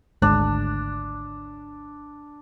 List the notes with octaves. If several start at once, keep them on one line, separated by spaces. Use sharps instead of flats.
G#1 D2 G#3 D4